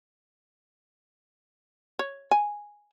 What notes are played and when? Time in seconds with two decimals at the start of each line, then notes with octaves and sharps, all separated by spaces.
1.99 C#5
2.31 G#5